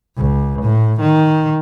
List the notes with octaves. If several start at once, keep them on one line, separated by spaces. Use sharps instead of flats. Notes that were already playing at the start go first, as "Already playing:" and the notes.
C#2
A2
D#3